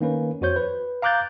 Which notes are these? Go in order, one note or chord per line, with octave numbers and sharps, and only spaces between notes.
D#3 A#3 C#4 B4
F2 F#4 C5 C#5 G6
B4
F5 A#5 D6 F#6 G6 A6